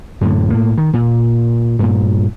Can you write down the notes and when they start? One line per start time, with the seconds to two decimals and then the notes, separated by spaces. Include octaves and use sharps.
0.21 F#2 A2 D3
0.50 A2 A#3
0.78 D#3
0.93 A#2
1.79 G2 A#2